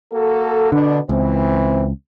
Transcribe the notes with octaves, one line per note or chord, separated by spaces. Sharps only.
A#3 F#4 A4
B2 D3 B3 D4
C#2 E3 C4